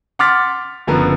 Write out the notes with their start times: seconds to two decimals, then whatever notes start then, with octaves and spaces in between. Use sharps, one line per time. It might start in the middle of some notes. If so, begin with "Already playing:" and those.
0.19 F#5 C6 D6 F6 A6 B6
0.87 F#1 D3 F3 B3 A#4